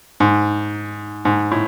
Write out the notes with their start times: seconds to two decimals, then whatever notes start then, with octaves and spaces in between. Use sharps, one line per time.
0.20 G#2
1.25 G#2
1.52 A2